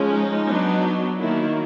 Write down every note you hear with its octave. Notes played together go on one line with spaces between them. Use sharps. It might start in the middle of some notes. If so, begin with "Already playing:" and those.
Already playing: F3 G#3 C#4
D#4
F#3 B3 D4
D#3 F#3 A#3 E4